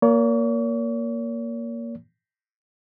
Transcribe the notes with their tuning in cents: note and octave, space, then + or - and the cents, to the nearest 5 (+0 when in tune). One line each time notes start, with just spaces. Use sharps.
A#3 +0 C#5 +45